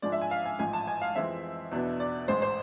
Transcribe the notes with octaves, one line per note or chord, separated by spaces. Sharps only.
G#2 F3 G#3 D4 D5
E5
G#5
F5
G#5
A1 G#2 F3 G#5
A5
G#5
F5
F2 E3 G#3 C4 E5
E2 B2 B3 D4
D5
A1 G#2 G#3 C5
C5